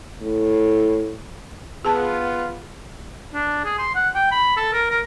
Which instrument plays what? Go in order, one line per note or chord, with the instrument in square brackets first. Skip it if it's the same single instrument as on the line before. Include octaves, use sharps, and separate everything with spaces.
[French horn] A2
[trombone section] B3 F4 [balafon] G#4 A5
[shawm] D4
G#4
C6
F#5
G5
B5
A4
A#4
A#4